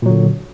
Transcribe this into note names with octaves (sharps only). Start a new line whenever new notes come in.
A#2 D3 F#3